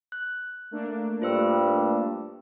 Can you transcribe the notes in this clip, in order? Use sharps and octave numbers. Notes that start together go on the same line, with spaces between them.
F#6
A3 A#3 D4
G2 F4 C5 E6